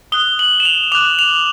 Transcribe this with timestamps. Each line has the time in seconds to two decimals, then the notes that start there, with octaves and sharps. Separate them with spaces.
0.12 D#6 F#6 G7
0.39 F#7
0.60 E7
0.65 F7
0.92 D6 F#6 F7
1.19 F7